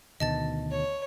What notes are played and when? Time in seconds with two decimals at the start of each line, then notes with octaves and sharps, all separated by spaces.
0.20 D2 B2 D#3 D#5 A5 A6
0.71 C#5